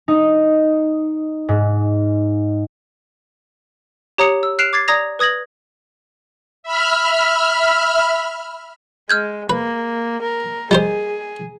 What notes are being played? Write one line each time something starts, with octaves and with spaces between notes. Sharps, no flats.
D#4
G#2
G4 C#5 A#5 D#6 C#7 F7
E6
F6 F#6 C7 D7 E7 F7
D6 G#6 A6 C7
D5 A#5 D#6 G#6 A#6 F7
B4 D#6 G#6 A#6 F#7
E5 B5 F6
G#3 F6 G6 G#6
A#3 B4
A#4
G3 G4 G#4 C5 D#5